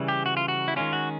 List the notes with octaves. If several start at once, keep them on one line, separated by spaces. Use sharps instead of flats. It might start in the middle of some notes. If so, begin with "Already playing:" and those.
Already playing: C#3 E3 G3
G4
F#4
F4
F#4
E4
D#3 G#3 C#4 F4
F#4